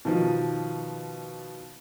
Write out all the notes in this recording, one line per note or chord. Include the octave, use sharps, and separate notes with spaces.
B2 D#3 F3